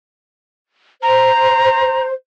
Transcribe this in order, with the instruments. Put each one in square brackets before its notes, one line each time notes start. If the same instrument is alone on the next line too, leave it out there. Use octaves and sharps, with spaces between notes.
[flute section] C5 [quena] A#5